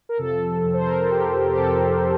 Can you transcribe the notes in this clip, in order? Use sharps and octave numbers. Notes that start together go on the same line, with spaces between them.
A#4
F2 C3 F3 A4
F2 C3 F3
C5
A#4
A4
F2 C3 F3 G4
G4
F2 C3 F3 A4